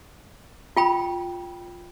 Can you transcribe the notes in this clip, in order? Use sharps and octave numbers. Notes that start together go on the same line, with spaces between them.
F4 G5 B5